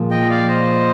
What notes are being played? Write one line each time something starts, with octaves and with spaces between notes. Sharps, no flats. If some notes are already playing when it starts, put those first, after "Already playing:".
Already playing: A#2 F3 G#3
D#5 G5
D5 F5
C5 D#5